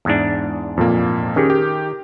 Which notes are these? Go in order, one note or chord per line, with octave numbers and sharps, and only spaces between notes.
E2 G#2 D4
F2 A#2 A#3
D#3 C#4 G4 G#4
G4